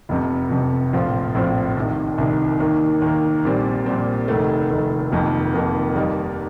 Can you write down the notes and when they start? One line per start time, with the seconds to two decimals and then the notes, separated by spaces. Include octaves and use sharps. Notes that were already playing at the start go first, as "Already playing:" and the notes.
0.09 F1 F2 C3
0.50 F1 F2 C3
0.93 A#1 A2 F3 C4 F4
1.35 A#1 A2 F3 C4 F4
1.77 C2 C3 D#3
2.18 C2 C3 D#3
2.60 D#2 D#3 A#3
3.02 D#2 D#3 A#3
3.44 A#1 A#2 G3 C4
3.86 A#1 A#2 G3 C4
4.28 F1 D#2 D#3 A3
4.70 F1 D#2 D#3 A3
5.12 F1 F2 D#3 A#3
5.54 F1 F2 D#3 A#3
5.95 D#2 D#3 G3 A#3 D#4